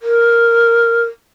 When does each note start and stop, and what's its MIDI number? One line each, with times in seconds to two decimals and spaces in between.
0.01 1.04 70